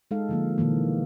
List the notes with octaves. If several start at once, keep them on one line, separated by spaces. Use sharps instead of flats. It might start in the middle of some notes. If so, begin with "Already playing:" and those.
G#3 D#4 A4 F5
D3 F3 A#3
B2 D#3 E3 A#3